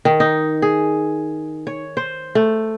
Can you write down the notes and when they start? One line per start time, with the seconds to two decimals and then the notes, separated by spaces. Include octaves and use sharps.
0.05 D#3
0.20 D#4
0.62 G#4
1.67 C#5
1.97 C5
2.35 A3